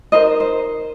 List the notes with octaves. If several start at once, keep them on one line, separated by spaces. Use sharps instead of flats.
D#4 A#4 C5 D#5
C5